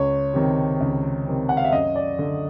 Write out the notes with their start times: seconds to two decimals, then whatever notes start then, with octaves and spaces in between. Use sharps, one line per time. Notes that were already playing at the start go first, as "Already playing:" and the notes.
Already playing: C#2 C#5
0.34 C3 D#3
0.80 C#2
1.26 C3 D#3
1.49 F#5
1.57 F5
1.65 E5
1.72 F#2 D#5
1.95 D5
2.19 D3